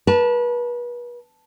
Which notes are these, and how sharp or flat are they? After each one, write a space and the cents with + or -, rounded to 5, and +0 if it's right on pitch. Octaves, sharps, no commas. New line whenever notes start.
B4 -35 A5 +0